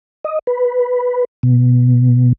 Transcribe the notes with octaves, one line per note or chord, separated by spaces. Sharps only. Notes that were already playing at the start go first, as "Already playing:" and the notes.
D#5
B4
B2